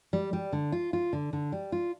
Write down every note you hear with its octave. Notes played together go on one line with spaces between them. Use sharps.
G3
G3
D3
F4
F4
D3
D3
G3
F4